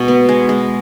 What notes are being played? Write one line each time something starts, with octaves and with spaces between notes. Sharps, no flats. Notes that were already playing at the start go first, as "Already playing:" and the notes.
Already playing: B2 G#3
B3
G#3
G#3